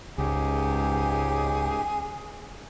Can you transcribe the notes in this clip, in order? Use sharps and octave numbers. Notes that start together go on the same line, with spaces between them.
C#2 G#2 G4 G#4